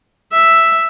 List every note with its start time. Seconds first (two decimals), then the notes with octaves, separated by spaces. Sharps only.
0.33 E5